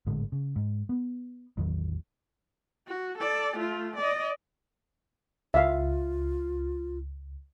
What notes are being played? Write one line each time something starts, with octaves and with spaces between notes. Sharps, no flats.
G#1 A2 D3 G#3
C#3
G#2
B3
A1 E2 D#3 F#3
F#4
A4 D5
A3 F4
D5 D#5
C#2 F4 E5 F5